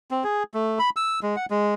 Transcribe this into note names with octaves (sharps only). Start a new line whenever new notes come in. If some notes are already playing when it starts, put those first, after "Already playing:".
C4
G#4
A3
B5
E6
G#3
F#5
G#3